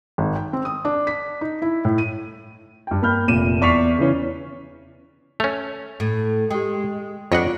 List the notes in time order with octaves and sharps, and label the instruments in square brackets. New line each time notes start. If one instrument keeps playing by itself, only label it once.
[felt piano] G#1
G5
C4
D#6
D4
B6
D#4
E4
A2
D#7
[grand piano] G2 G5
A#3 B5 F6 G6
F1 A#2 D#7 E7
E2 D5 C#6 B6 C7 F7
C#3 E3 C#4
[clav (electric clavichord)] A3 C#4 [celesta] F7
[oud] A2
[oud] G#3 [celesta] G4 G5
[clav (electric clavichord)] F2 D#5 F#5 [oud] D4 C#5 [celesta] F4